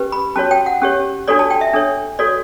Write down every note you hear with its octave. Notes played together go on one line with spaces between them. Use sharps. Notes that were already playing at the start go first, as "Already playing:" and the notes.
Already playing: C#4 G4 B4
B5
C#4 F#4 C#5 A5
G5
F#5
C#4 G4 C#5
D4 F#4 A4 C#5 D5
A5
G5
E5
D4 A4 C#5
F#4 A4 C#5 D5